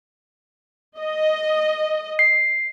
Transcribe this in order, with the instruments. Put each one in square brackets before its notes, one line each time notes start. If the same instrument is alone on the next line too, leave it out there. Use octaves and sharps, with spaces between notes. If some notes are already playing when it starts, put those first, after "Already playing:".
[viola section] D#5
[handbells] C7